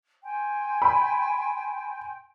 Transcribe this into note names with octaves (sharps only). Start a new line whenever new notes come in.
G5 G#5 C6
B5